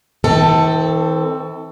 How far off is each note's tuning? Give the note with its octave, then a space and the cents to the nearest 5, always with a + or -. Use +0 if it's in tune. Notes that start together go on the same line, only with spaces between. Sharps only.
E3 -45 C4 +0 A4 +15